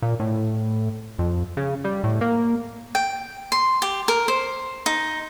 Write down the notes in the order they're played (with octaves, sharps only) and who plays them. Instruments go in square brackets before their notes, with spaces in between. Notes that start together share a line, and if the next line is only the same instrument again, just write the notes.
[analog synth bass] A#2
A2
F2
C#3
G3
A2
A#3
[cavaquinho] G5
C6
G4
A#4
C5
D#4